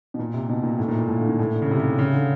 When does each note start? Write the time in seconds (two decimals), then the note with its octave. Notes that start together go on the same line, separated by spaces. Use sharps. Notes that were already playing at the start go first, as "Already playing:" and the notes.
0.14 B2
0.19 A#2
0.34 C3
0.49 B2
0.63 A#2
0.79 A2
0.88 A#2
0.99 A#2
1.08 A2
1.19 D3
1.29 A#2
1.39 A2
1.54 D3
1.62 C#3
1.71 C3
1.80 C#3
1.99 C#3
2.14 D3